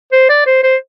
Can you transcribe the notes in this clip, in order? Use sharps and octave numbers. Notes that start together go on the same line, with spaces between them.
C5
D5
C5
C5